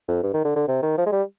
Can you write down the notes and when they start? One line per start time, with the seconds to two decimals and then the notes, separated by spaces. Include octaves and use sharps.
0.08 F2
0.23 G2
0.34 D#3
0.45 D3
0.56 D3
0.68 C3
0.82 D#3
0.98 F3
1.06 G#3
1.12 G3